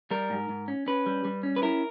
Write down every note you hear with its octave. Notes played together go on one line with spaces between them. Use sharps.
G3 A#4
G#2
G#2
C#4
C#4 B4
G3
G3
C#4
B4
E4 A#4